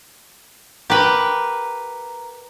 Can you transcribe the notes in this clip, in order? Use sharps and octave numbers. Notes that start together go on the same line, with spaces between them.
G4 A#4 B4 F#5